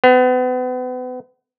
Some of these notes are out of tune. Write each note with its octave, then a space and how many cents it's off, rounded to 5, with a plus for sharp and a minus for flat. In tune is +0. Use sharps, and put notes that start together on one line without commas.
B3 +35